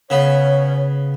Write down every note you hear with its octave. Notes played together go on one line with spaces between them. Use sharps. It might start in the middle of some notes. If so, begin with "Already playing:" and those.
C#3 B3 C#5